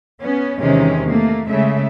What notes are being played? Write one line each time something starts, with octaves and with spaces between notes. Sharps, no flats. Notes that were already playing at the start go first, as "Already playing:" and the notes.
B3 C#4
E2 C3 D#3 G#3 C#4
A3 A#3
C#3 G#3 A3 E5